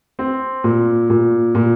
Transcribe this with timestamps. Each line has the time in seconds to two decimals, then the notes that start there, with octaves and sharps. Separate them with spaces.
0.19 C4
0.64 A#2
1.10 A#2
1.55 A#2